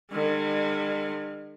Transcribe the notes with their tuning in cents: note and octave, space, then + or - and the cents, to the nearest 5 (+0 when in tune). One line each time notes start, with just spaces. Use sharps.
D3 +45 G#3 -45